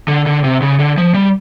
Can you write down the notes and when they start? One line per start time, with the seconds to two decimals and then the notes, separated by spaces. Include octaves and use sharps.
0.08 D3
0.26 D3
0.44 C3
0.62 C#3
0.79 D3
0.98 F3
1.14 G3